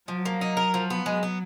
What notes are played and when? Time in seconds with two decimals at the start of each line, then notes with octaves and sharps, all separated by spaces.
0.08 F3 F#3
0.25 A#3
0.41 D#4
0.57 A#4
0.74 F3
0.90 B3
1.06 F#3 G#3
1.23 B3